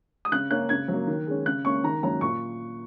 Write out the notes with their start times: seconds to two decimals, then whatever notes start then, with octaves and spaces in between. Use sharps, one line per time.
0.25 D#6
0.32 C#3 F#6
0.51 A#3 C#4 F#6
0.69 C#3 G#6
0.88 F#3
0.93 A#3
1.07 D#3
1.27 G#3 C#4
1.45 C#3 F#6
1.65 A#3 C#4 C#6
1.84 D#3 A#5
2.03 F#3 A#3 C#4 A#5
2.21 A#2 C#6